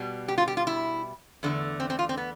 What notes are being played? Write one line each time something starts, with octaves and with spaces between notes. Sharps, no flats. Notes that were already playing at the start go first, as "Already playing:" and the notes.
Already playing: B2 G3
G4
F4
G4
F4
E4
E2 D3 A3
C4
C4
F4
C4
B3